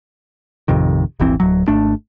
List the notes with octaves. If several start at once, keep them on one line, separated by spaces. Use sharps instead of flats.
A1 F2 C3 D#3
D#1 G#1 E3 C4
D1 F#3
G#1 A3 D4